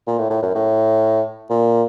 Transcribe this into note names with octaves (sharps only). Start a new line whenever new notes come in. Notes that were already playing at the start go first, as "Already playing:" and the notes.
A#2
A2
A2
F#2
A2
A#2